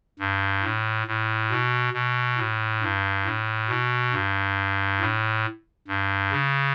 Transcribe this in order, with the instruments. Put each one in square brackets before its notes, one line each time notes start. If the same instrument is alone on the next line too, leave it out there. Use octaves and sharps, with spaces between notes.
[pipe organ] G2
A2
A2
B2
B2
A2
G2
A2
B2
G2
A2
G2
C#3